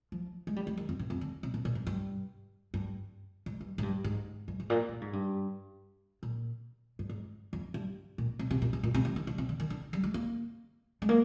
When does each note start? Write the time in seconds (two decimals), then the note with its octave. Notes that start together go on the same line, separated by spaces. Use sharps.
0.12 F3
0.47 G#3
0.56 G3
0.67 G#3
0.77 D#3
0.89 F2
0.99 G2
1.10 F2
1.21 D3
1.43 C3
1.54 A#2
1.65 A#2
1.75 G#2
1.87 G2
2.74 G2
3.46 G#2
3.61 G2
3.78 G#2
3.83 G2
4.04 G#2
4.48 G2
4.60 G#2
4.70 A#2
4.89 A#2
5.01 G#2
5.13 G2
6.23 A#2
6.99 G2
7.09 G#2
7.53 F2
7.74 G2
8.18 A#2
8.39 C3
8.51 C3
8.62 A#2
8.73 G#2
8.83 A#2
8.94 C3
9.05 D3
9.16 D#3
9.27 D3
9.38 C3
9.49 D3
9.60 D#3
9.70 D3
9.93 G3
10.03 G#3
10.14 A#3
11.02 G#3
11.09 A#3